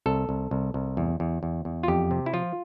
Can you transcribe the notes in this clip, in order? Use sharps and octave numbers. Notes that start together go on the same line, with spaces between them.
C2 A4
C2
C2
C2
E2
E2
E2
E2
F4
F2 G4
C3
E4
F3 F4